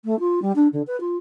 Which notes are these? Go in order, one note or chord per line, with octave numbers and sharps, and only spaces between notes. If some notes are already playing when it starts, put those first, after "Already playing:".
A3
F4
G3
D4
D3
B4
F4